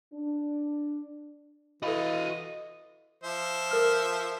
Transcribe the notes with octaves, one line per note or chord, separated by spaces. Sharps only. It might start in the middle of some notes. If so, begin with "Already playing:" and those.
D4
E3 F#4 A4 D#5 F5 B5
F3 C5 E5
A4 A#4 F6